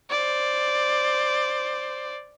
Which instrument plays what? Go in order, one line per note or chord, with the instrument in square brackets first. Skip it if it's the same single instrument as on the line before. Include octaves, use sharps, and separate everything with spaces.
[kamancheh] C5 D5